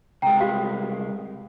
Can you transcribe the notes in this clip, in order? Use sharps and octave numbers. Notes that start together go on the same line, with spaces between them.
C2 G#3 G5 A#5
F#4 G4 F5